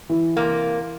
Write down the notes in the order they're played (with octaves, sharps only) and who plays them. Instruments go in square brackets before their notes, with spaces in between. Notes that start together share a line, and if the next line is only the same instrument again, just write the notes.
[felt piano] E3
[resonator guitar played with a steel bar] C3 A#3